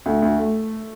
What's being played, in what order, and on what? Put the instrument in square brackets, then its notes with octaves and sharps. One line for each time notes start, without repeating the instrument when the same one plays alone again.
[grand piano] D2 [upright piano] A3
[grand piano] D2
[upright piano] A3